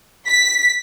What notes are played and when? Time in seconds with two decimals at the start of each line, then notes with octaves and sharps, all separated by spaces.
0.27 B6